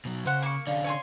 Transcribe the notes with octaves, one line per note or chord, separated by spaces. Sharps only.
B2 F#3
C#3 C5 F#5
A#3 C#6
D3 C#4 D5 F5
C#5 G#5 C6